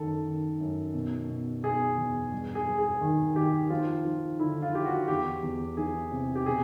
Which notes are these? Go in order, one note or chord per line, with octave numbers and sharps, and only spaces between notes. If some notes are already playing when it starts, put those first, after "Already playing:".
Already playing: F#2 D#3 A4
D#3
F#2
B2
B2
B2 G#4
E2
G2
G#4
G2
G#4
D#3
D#3 G4
F3 F4
F3
D3 E4
F4
F3 G4
F#4
E2 G4
E2
E3 G#4
C3
G4
B2 G#4